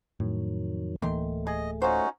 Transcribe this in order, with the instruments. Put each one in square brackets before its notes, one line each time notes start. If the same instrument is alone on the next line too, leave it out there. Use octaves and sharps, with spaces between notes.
[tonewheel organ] F2 D#3 F#3 [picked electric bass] A2
[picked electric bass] D1 E3 A#3 [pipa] D#3 C6 [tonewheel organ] A3
[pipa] G#4 [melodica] D#5
[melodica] C#4 D#4 F#4 [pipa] F4 C5